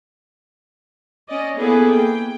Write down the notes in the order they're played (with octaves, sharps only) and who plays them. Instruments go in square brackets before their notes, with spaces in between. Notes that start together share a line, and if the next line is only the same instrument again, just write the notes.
[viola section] C#4 D5 D#5
A#3 B3 E4 G#4 A4 B4
G5